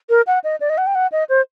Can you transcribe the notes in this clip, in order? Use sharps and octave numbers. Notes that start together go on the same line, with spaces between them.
A#4
F#5
D#5
D5
D#5
F#5
G5
F#5
D#5
C5